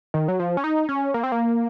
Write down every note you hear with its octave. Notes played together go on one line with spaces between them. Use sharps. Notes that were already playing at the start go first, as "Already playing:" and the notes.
D#3
F#3
F3
C#4
D#4
C#4
A#3
C4
A#3